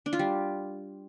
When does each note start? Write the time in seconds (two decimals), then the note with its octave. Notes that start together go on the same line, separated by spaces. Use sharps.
0.06 D4
0.13 F4
0.19 G3